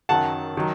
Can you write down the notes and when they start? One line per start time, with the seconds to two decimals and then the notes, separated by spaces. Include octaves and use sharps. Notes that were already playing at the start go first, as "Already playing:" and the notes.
0.09 F#2 D#3 F#3 F#5 A5
0.57 D#3 F#3